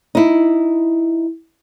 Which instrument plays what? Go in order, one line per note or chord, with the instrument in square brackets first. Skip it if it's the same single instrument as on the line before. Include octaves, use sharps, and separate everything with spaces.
[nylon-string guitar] D#4 E4